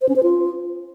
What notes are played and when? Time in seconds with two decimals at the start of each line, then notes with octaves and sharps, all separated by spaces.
0.02 C5
0.09 C#4
0.16 C5
0.23 F4